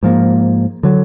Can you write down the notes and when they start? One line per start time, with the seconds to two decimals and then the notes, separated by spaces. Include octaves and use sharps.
0.03 G#2 F3 A#3
0.83 D3 F#3